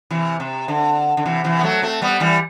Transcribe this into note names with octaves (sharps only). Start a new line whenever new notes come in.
C3 E3
C3
D3
D3
C3 E3
C3 E3
B3
F#3 A3
A3 C4
G3 B3
E3 G3